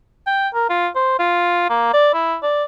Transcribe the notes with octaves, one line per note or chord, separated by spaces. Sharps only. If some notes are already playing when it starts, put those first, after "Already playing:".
G5
A#4
F4
C5
F4
A#3
D5
E4
D5